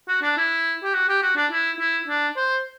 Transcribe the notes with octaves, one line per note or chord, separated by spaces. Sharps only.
F#4
D4
E4
G4
F#4
G4
F#4
D4
E4
E4
D4
C5